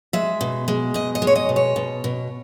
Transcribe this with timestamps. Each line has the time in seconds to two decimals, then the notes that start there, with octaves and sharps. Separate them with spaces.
0.13 G#3 E5
0.41 B2
0.68 G#3
0.94 B2 D#5
1.15 D#5
1.22 G#3
1.27 C#5
1.35 D#5
1.49 B2
1.56 C#5
1.76 B2
2.04 B2